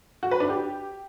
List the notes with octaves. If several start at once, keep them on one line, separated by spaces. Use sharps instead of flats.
F#4
B4
D4
G4